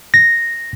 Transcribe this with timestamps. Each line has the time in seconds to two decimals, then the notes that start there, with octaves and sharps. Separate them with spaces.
0.14 A#6